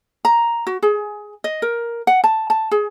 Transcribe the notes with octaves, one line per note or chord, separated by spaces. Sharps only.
A#5
F#4
G#4
D#5
A#4
F#5
A5
A5
G#4